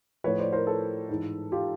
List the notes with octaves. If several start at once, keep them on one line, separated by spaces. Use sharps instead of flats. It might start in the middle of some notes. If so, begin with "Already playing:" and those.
A2 F3 B4 C#5
C5 D5
A#4 C5
A4 B4
G#2 E3
F4 G4